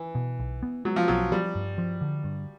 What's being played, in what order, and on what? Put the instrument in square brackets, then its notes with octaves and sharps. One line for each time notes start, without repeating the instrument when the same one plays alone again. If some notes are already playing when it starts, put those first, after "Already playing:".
Already playing: [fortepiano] E3
[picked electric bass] B2
B1
B3
[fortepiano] F#3 [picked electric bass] G#3
[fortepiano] F3
[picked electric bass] B1 [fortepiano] F#3
[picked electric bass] F3 [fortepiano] G3
[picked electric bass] G2
F3
D3
G2